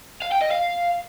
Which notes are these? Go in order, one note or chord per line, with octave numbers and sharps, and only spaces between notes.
F5
G5
D#5
F5